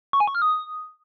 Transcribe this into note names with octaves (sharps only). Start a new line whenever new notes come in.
C#6
G#5
C#6
F6
D#6